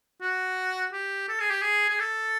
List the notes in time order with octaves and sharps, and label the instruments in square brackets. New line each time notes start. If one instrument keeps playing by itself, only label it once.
[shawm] F#4
G4
A4
G#4
G4
G#4
G#4
A4